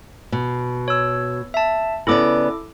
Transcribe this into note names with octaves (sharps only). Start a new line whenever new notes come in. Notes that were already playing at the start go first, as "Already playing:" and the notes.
B2
C#5 E6
E5 A5
C#3 B3 E4 A4 D5 D6